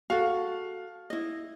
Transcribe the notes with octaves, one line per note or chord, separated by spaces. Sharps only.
F#4 A4 F5
E4 D#5